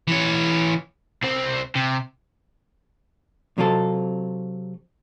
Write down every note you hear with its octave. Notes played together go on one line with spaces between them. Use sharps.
E3 C#5
C2 C4
C3
C3 F#3 C4 F4 A4